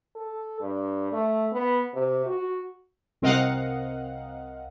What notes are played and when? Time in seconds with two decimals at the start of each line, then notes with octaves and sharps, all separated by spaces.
0.15 A4
0.60 G2
1.12 A3
1.53 B3
1.94 C3
2.26 F#4
3.22 C2 C4 A#4 D#5 F5 F#5